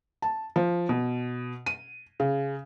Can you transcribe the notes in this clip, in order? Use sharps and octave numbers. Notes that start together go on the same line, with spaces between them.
A5
F3
B2
D#7
C#3